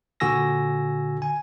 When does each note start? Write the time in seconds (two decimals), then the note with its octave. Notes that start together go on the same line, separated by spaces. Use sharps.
0.20 A#2 D3 F#4 G#5 E6 A#6
1.22 G#5